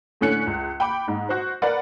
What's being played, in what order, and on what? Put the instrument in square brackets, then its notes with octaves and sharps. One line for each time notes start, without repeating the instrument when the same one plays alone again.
[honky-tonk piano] A2 D3 C#4 F#6 C#7
C#2
G5 B5 D6
G#2
F#4 C5
A#4 B4 D5 F#5